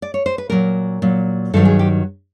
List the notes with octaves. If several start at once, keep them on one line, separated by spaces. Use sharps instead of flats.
D5
C#5
C5
B4
A#2 F#3 A#4
A#2 F#3
G2 D#3 F#3 A4
G#4
G4